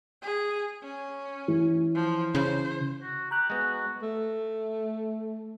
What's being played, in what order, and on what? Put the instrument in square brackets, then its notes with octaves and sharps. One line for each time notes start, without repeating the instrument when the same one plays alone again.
[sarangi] G#4
C#4
[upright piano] E3
[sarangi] F3
[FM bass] C#3 [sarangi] C5
[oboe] F#4
[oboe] G4 [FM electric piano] A#5 F#6
[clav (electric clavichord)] G#3 B3 [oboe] F#4
[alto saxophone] A3